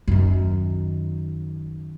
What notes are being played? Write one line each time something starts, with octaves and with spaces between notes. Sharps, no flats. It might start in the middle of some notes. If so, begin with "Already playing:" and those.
F#2 D#3